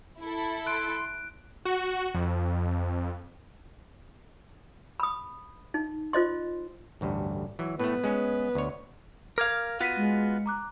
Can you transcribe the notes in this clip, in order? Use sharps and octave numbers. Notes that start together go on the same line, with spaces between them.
E4 A4
C6 F#6 D7
F#4
F2
B5 D#6
D#4
F4 C5 D#5 C6
A1 D2 G2
E3 F#3
A2 A3 B3
G#3 C#4
D2 C#5
A#4 F5 D6 G#6
B3 F4 F#4 F#6 B6 D#7
G#3
A#5 D6 F#6